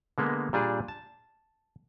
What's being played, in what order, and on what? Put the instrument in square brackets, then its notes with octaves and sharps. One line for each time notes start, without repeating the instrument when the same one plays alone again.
[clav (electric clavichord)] D3 G#3 A#3 B3
A#2 G3 D4 G#4
A5